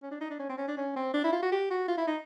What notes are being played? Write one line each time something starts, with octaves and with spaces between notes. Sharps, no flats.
C#4
D4
D#4
D4
C#4
C4
C#4
D4
C#4
C4
D4
E4
F4
F#4
G4
F#4
F4
E4
D#4